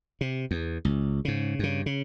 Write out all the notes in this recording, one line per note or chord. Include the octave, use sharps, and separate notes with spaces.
C3
E2
C#2
G#2 C#3
G2 C#3
C#3